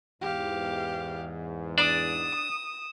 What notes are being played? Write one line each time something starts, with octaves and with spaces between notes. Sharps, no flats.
E2 G#2 G4 F5
D4 D5 D#6 E7